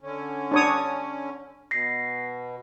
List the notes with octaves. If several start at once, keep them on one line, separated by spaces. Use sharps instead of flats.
D3 C#4
D4 C#5 D#6
B2 A#6 C7